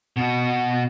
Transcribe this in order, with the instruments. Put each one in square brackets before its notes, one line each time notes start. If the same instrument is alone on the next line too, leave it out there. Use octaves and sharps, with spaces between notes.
[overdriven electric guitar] B2 F#4